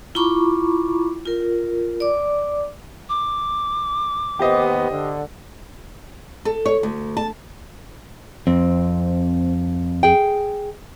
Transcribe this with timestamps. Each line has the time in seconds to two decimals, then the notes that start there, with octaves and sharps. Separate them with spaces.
0.15 E4 F4 A#5 B5 C#6 D6
1.26 F4 A#4
2.00 D5 D6
3.09 D6
4.39 D#2 D#3 B3 G4 C5 D#5
4.90 D3
6.45 A4
6.66 C#5
6.83 D2
7.17 A5
8.47 F2 C4
10.03 G#4 G5